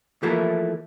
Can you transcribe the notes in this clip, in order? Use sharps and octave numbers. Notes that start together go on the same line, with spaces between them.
E3 F3 A3 A#3 E4